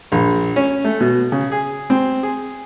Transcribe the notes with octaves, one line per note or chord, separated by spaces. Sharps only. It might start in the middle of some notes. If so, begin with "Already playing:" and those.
A#1
C#4
A3
B2
C#3
G#4
C4
G#4